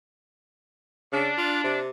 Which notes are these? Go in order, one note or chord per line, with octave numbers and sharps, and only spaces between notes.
C#3 D4
F4
C3